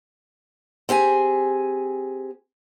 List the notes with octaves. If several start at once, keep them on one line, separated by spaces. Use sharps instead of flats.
C4 G4 G#4 G#5